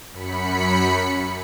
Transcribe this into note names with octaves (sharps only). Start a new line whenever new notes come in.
F#2 B5 B6 C#7